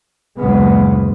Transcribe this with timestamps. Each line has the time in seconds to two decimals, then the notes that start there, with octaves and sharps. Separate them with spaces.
0.38 F#1 D2 A#2 C#3 G#3 B3